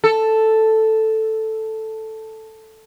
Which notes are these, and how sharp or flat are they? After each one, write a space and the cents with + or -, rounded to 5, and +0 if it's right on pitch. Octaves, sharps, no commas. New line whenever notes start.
A4 +0